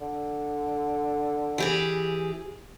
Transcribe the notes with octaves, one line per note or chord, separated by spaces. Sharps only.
D3
E3 G4 G#4